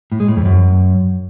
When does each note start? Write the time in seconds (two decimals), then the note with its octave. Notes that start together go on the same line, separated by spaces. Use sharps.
0.12 A2
0.20 G#3
0.28 A2
0.37 F2
0.45 F#2